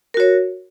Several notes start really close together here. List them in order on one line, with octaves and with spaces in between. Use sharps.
A#4 F#4 C#5